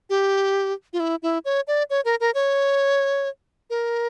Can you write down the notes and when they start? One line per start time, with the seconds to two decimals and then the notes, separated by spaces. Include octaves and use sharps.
0.10 G4
0.93 F4
1.00 E4
1.23 E4
1.45 C#5
1.68 D5
1.90 C#5
2.05 A#4
2.20 A#4
2.34 C#5
3.70 A#4